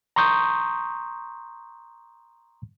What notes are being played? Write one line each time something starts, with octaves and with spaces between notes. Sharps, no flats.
A#5 C6 C#6 D#6 G6